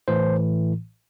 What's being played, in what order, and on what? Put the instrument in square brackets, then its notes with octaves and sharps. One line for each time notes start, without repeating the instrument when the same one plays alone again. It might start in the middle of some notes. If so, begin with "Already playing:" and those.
[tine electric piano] A1 A2 E3 C5